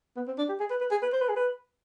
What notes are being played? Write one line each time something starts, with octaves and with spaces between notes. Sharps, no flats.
B3
C4
D4
G4
G#4
B4
B4
G#4
B4
C5
B4
G#4
B4